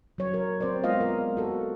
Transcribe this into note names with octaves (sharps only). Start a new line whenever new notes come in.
F#3 C#5
A#4
C4 C5 D5
G#3 B3 F4 D#5 F5
A#4
F#4 A4